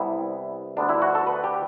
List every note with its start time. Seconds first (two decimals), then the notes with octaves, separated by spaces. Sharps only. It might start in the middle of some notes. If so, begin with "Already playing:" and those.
Already playing: C2 C3 G3 B3 E4
0.77 D2 D3 G3 B3 D4
0.89 E4
1.02 F#4
1.15 A4
1.27 B4
1.44 G4